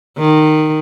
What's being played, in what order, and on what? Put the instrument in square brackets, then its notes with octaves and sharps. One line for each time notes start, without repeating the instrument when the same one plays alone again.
[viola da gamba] D#3